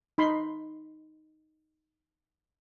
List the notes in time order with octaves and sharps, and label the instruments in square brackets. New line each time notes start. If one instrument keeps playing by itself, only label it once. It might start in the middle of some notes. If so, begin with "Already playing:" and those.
[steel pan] D#4 B5 C6